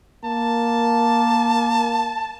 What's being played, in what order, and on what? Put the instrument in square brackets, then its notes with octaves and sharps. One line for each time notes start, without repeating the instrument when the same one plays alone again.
[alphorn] A#3 [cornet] A5